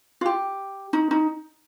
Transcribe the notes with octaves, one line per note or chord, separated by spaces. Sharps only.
F4
G4
D#4
D#4